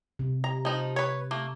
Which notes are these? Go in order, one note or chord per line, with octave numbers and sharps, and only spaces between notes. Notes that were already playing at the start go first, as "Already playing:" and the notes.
C3
A#5
F3 D#4
B4 C#5
A3 A#3